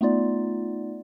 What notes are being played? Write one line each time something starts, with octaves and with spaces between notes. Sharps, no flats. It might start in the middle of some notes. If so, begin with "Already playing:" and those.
A3 B3 D#4 F4 D5